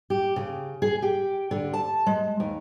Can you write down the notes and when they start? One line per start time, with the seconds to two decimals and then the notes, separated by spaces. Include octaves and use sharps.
0.10 G4
0.36 C#3
0.82 G#4
1.02 G4
1.51 D3
1.73 A5
2.06 G#3
2.40 D#2